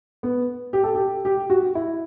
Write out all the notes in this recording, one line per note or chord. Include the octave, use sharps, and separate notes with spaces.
B3
G4
A4
G4
G4
F#4
E4